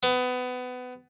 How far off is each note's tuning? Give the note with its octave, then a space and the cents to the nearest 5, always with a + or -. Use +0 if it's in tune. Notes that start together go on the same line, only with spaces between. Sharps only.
B3 +25